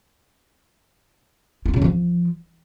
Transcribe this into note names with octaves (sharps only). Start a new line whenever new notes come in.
F4
C#3
F3